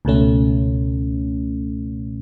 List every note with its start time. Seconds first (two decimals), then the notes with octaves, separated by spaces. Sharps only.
0.05 C#2 B2 A3 C#4